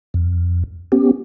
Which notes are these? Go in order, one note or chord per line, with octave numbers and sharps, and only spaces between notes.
F2
B3 C#4 G4